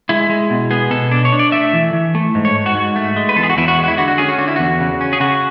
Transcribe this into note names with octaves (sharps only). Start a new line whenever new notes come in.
G#3 E4
G#3
B2
B3 G#4
B2 A4
D4
C#5
D4
D5
A3 E5
E3
E3
A3
G#2
C#5
G#2
F#4
G#2
A3
G#3
B4
E2 A4
G#4
F#4
E2 E4
F#4
G#3
F#4
E4
D3 F#4
F#4
C#4 G#4
F#4
D3 F#4
E4
E2 F#4
C#3
C#4
G#4
C#3 F#4